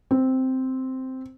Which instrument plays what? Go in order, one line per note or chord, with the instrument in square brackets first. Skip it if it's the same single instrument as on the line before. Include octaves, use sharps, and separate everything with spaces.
[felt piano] C4